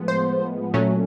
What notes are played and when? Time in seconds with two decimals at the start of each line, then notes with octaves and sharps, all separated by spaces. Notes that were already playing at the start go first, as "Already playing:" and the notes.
Already playing: A2 F3 G#3 B3
0.08 C5
0.74 A#2 F#3 A3 C#4